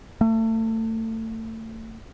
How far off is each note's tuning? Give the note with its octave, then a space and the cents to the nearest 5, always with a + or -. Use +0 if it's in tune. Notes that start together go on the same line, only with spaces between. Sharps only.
A3 +30